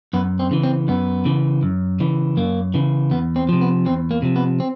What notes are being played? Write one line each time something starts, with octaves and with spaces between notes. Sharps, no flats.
F#2 B3
C4
C#3 E3
C4
F#2 B3
C#3 E3
F#2
C#3 E3
F#2 A#3
C#3 E3
E2 B3
C4
C3 F3
B3
E2 C4
A#3
C3 F3
B3
C4